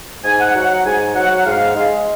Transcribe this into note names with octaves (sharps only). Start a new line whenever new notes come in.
G#2 G#5
F#5
F#3 F#5
F#5
G#2 G#5
F#3 F#5
F#5
G#2 F5
G#3